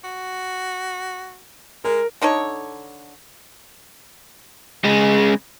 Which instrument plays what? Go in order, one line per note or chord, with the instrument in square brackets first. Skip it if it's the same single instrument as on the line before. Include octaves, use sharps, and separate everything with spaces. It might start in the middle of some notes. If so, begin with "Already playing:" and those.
[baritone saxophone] F#4
[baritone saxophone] G#3 [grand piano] A#4
[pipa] D3 D#4 A4 C#5
[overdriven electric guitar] C#3 G#3